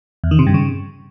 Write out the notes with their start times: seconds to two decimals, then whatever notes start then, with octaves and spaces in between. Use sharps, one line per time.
0.24 E2
0.31 D#3
0.39 C3
0.46 G2
0.54 C#3